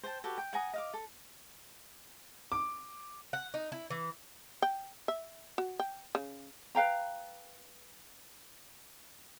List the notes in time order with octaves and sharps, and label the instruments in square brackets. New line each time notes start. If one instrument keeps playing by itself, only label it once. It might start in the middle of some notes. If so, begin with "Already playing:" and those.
[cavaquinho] C5 G5 A5
F#4 G4 A4 B4
G5
F#5 G#5 A#5 D#6
D#5 F5 D6
A4
[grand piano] D6
[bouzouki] F#5
D#4
E4
E3
[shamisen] G5
E5
F#4
G5
C#3
[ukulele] B4 F5 G5 A#5